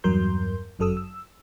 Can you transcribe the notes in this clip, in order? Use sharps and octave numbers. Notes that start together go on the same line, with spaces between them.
E2 G2 F#3 A#4 C6 G6
G1 F#2 F#3 A4 D#6 E6
E6